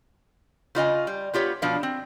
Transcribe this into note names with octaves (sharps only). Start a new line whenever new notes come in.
C#3 F4 D#5 G#5
G3
B3 F4 G4 C#5
B2 F3 D4 F5
C4